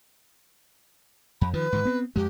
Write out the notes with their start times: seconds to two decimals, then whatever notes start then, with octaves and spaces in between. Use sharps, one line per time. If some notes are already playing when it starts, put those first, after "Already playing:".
1.41 F2 B5
1.54 D#3 F3 B4
1.73 G#2 D#3
1.85 B3 C4
2.16 F2 G#3 G4